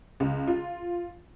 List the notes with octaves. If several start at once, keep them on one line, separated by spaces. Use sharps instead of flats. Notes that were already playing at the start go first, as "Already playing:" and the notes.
C#2
F4